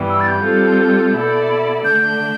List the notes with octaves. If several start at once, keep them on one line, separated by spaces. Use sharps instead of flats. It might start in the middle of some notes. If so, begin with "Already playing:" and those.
Already playing: G2 E3 G3 B3
E6
A6
G6
G3 C4 F4 A4
B2 B3 E4 A4 D5
D3 A3 D4 G6